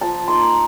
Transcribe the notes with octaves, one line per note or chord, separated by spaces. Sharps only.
F3 A5
A#3 D#4 C6